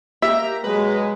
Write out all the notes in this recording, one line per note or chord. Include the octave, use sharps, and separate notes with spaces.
A#3 G4 E5 A#5
B2 F#3 G#3 G#4 B4